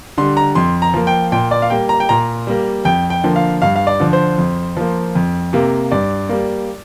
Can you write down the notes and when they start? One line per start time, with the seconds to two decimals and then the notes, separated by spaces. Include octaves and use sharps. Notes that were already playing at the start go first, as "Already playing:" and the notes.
0.18 D3 G3 C6
0.37 A#5
0.55 F2 C6
0.82 A#5
0.94 F3 A#3
1.07 G5
1.32 A#2 G5
1.51 D5
1.62 F5
1.70 G3 A#3 G5
1.89 A#5
2.00 G5
2.09 A#2 A#5
2.47 G3 A#3
2.85 F2 G5
3.10 G5
3.24 D3 F3 A#3
3.36 F5
3.62 G2 F5
3.76 F5
3.87 D5
4.00 D3 F3
4.13 C5
4.38 F2
4.77 F3 A#3
5.15 F2
5.53 C3 A#3
5.91 G2 D5
6.29 G3 A#3